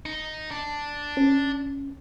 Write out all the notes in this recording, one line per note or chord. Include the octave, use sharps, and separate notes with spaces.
D#4
D4
C#4